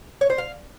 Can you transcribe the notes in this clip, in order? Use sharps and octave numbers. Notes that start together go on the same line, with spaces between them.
C#5
C5
F5